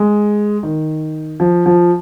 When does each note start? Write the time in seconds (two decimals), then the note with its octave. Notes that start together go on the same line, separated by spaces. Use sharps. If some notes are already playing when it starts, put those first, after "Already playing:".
Already playing: G#3
0.63 D#3
1.40 F3
1.66 F3